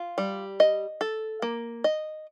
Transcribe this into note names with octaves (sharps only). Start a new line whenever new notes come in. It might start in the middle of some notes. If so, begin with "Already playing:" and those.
Already playing: F4
G3
D#5
A4
A#3
D#5